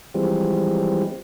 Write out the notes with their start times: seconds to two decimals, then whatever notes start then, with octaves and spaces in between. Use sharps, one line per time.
0.14 E3 F3 G3 G#3 C4